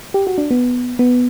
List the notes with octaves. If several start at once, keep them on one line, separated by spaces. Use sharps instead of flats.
G4
F#4
D4
B3
B3